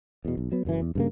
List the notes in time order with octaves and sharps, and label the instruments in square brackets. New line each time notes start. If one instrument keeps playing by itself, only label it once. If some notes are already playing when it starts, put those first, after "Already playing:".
[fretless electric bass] E2 B2
B1
F#3 B3
F#1 F#2 A#2 E3
E2
G2 C#3 A#3